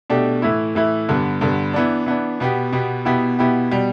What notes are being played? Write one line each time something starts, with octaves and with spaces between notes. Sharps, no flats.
B2 A3 D4 G4
A2 E3 A3 E4
A2 E3 A3 E4
G2 D3 B3
G2 D3 B3
E3 B3 D4
E3 B3 D4
B2 B3 G4
B2 B3 G4
B2 B3 E4 G4
B2 B3 E4 G4
B2 G3